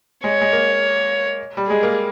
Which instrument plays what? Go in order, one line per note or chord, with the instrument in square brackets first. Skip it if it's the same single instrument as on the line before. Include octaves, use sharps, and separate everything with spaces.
[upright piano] G#3 [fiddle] C#5
[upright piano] G#3
A#3
G3
[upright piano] G#3 [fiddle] G#4
[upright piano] A#3